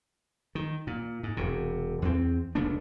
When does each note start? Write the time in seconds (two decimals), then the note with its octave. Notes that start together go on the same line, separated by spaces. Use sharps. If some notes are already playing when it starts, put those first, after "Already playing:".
0.55 D#3
0.87 A#2
1.23 G#2
1.37 E1 C3
2.02 E2 C4
2.55 F1 C#2 B3 D4